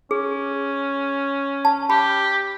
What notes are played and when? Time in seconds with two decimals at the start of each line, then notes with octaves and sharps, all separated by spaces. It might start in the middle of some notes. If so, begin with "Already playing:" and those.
0.11 C#4 G#4
1.65 A5
1.90 G4 B5